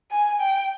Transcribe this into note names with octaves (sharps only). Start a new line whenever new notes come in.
G#5
G5